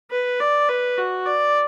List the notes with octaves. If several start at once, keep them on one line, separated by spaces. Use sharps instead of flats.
B4
D5
B4
F#4
D5